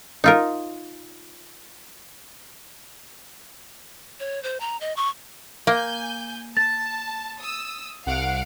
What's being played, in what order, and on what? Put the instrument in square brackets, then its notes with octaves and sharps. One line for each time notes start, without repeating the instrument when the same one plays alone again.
[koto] D#4 F4 A#4
[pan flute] C#5
C5
A#5
D#5
C#6
[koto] A#3 [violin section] G#5 G6
[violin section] A5 [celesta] A6
[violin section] D#6 E6
[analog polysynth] C2 F#5 D7 [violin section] F5